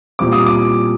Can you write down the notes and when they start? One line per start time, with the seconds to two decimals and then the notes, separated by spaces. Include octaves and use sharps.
0.19 A#2 G3 C4 D6
0.33 D#6
0.46 D6